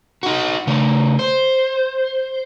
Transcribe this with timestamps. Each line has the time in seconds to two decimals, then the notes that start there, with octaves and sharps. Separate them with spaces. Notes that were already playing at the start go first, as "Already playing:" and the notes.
0.23 D#4 F#4
0.67 C#3 A3
1.19 C5